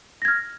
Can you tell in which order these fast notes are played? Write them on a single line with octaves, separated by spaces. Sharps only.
A#6 G#6 F6